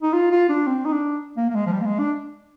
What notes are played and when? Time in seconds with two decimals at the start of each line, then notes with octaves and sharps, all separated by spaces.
0.02 D#4
0.13 F4
0.32 F4
0.49 D4
0.67 C4
0.85 D#4
0.93 D4
1.37 A#3
1.49 A#3
1.55 G#3
1.67 F3
1.72 G3
1.82 A#3
1.85 G#3
1.99 D4